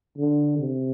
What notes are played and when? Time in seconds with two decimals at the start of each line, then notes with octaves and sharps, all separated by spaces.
0.18 D3
0.58 C3